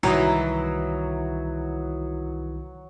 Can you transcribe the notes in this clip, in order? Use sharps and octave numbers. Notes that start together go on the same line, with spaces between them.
C2 D#3 E3 F#3 E4 D#5